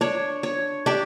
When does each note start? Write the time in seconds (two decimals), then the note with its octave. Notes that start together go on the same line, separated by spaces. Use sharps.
0.01 D4 C#5
0.43 C#5
0.86 D4 G4